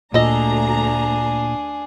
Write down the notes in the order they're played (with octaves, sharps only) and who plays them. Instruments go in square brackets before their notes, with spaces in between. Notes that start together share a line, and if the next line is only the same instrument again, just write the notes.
[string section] D2 A#5 [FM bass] A#2 [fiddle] D4 G#4 [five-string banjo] A4 D#5